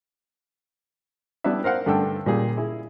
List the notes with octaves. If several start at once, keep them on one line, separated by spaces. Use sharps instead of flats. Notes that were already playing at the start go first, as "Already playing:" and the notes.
G3 B3 D4 E4 B4 E5
A#4 C5 F5 F#5
G2 D3 A3 G5 E6
A#2 G3 G#4
E4 G#4